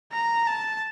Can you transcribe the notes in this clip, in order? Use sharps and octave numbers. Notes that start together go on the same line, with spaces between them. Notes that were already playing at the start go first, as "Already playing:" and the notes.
A#5
A5